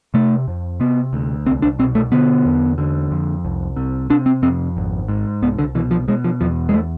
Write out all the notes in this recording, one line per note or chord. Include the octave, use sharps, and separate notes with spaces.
C3 A3
F2
C3 B3
D2
C2 C4
D4
B2 C4
A3
D3 B3
E2
D3
F2
C2
C3
C3 D4
C4
F2 C4
G#1
G#2
C2 B3
D3
B2 E3
F3
B2 G#3
F3
E2 F3
G#3
A3